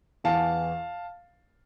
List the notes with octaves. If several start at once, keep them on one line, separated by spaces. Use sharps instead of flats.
E2 E3 F5 A5